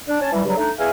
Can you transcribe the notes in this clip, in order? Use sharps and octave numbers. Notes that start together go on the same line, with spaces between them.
D4
C#4 G#5 A5
E3 F#3 G3
G2 C#3 F#3 G3
A3 D4 D#4
E2 G#4 E5 F5 G#5